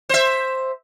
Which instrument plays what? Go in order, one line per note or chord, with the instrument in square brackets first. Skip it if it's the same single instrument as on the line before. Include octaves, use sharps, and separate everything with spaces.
[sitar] C5 E5